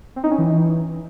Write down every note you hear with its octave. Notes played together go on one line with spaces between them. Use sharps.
C4
D#4
C#4
E3